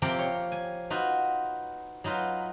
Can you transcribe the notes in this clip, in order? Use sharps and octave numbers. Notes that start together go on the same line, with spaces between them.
C3 F3 A#3 G4 A#4 G5
C#5
G#5
D#4 F4 F#4 B4
F#3 D#4 F4 B4